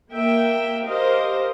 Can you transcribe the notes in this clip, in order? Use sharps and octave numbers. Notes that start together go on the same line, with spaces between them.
A#3 E5 G5
G4 A#4 C5 D#5 F5